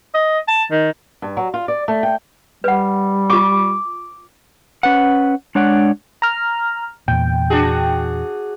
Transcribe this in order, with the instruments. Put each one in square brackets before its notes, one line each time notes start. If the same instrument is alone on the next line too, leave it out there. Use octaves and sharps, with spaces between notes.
[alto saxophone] D#5
A5
D#3
[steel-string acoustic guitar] G2
F#3
F4
D5
A3
G5
[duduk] G3 [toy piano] B4 F#5
[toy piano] F4 C#6 [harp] D6
[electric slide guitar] C#4 B4 F#5
G#3 D4 C#5 D5 F#5
[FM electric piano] A#5 F6
[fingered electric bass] E2 A#2 [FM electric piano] G5
[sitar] D4 F#4 G#4